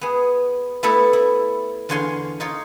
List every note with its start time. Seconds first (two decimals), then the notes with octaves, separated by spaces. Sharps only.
0.01 B3 G#4
0.83 A3 B3 E4 A4 E5 A5
1.13 E4
1.89 E2 D3 F4 C#5 G#5 C6
2.40 D#4 F4 C#5